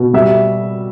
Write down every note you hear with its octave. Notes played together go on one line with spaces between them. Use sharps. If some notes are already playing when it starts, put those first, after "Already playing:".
Already playing: B2
G3 E5